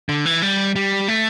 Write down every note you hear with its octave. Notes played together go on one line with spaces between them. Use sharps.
D3
E3
G3
G3
A3